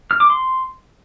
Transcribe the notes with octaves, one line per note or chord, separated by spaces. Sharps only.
F6
D6
C6